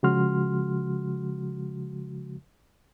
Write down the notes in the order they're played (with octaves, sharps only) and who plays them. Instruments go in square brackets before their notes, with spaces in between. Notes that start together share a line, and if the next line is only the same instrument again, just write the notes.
[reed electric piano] C#3 F3 G#3 F#4 C6 F6